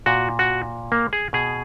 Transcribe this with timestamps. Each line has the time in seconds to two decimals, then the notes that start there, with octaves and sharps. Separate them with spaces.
0.06 A#2 F#4
0.39 F#4
0.92 A#3
1.13 G#4
1.33 B2 G#4